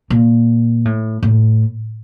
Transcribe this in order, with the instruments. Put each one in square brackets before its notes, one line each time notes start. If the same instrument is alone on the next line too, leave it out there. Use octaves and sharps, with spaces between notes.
[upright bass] A#2
A2
A2